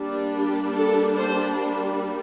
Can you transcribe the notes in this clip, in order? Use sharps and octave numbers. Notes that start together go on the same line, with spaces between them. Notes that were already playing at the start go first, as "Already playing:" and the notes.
Already playing: G3 A#3 D4
G4
A4
C5